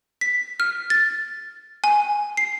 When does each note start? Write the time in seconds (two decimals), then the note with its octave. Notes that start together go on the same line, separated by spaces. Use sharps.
0.21 B6
0.60 F6
0.90 A6
1.84 G#5
2.37 C7